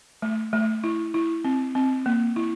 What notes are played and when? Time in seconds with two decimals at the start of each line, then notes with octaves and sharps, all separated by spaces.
0.22 A3
0.53 A3
0.84 E4
1.14 E4
1.45 C4
1.75 C4
2.06 A#3
2.36 E4